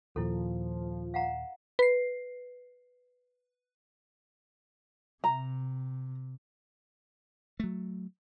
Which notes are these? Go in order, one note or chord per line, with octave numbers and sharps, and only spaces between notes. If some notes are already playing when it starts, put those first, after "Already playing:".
D#2 A#2 F3 E4 A4
F5 F#5 A#5
B4 C7
C3 A#5
F#3 A3